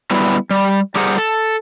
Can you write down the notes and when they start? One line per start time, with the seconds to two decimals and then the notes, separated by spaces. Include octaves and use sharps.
0.11 F#3 G3 B3 E4
0.50 G3
0.96 G3 G4 G#4 A#4 C5 F#5
1.18 A4